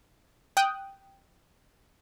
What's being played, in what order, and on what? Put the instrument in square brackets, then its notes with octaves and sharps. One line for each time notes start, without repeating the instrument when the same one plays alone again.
[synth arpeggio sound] G5 D#6 F#6